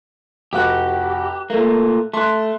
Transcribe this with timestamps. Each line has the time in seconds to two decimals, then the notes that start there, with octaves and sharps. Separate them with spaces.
0.53 F1 F#4 G4 F#6
1.50 A#2 A3 A#3
2.14 A3 C6 F#6